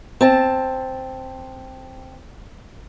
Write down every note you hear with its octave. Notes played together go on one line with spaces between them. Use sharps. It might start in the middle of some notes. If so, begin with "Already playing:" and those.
C4 A5